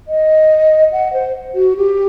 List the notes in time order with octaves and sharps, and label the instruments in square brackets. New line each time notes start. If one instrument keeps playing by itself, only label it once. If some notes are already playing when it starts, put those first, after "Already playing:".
[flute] D#5
F#5
C5
F#4
G4